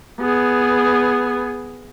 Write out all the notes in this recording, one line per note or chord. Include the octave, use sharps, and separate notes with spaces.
B3 G#4